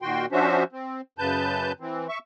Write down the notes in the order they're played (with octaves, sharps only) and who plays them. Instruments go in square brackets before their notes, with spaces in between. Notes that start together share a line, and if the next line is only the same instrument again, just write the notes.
[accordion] A#2 D#3 F#4 G5 C6
F3 C#4 D4 F#4 C5 E5
C4
F#2 C#3 B4 A5 G6
E3 C4
E5 C#6